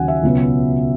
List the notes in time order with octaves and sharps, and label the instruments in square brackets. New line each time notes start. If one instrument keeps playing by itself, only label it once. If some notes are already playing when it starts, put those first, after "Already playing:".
Already playing: [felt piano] D#2 C#3 F#3 F#5 G#5
E5
C#2 B2 F#3 B3